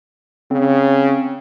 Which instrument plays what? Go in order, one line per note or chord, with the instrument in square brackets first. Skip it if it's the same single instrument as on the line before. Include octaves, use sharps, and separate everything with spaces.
[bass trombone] C#3 [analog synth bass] C4